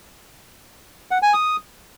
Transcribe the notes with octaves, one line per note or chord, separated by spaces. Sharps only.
F#5
G#5
D#6